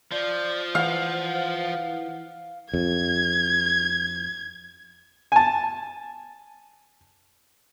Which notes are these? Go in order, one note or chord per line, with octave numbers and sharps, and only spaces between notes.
F3 D5
E3 F5 F#5
F2 G#6
G#5 A5